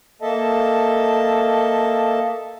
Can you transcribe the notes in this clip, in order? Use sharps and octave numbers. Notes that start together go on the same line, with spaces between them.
A#3 A4 D#5 E5 A5